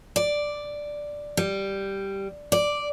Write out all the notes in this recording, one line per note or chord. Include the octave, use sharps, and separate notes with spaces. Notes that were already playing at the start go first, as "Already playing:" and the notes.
D5
G3
D5